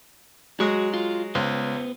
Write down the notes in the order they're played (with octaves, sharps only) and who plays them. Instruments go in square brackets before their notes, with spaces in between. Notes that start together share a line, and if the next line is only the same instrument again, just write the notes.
[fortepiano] F#3 G#3 [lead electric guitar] F#4
[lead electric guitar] F4
[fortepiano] C#2 [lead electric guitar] B3 C5